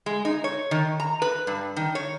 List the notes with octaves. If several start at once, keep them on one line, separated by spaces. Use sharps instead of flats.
G#3
D#4
C#5
D#3
A#5
B4
G2
D#3
C#5